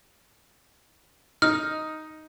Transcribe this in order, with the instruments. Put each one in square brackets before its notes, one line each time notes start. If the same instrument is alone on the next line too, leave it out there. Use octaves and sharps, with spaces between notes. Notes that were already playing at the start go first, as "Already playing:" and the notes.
[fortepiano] D#4 [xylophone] F6